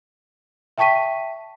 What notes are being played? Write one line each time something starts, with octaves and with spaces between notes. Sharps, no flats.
E5 G5 A5 C#6 B6 D#7